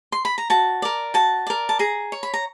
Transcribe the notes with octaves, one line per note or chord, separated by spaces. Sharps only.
C6
B5
A#5
F#4 A5
A#4 D5
F#4 A5
A#4 D5
A5
G#4 A#5
C#5
B5
A#5